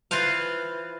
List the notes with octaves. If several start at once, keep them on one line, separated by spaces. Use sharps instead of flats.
E3 F4 B4 C5 F5